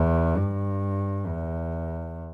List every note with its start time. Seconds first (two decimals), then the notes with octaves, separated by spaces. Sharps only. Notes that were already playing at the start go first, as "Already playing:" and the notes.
Already playing: E2
0.37 G2
1.27 E2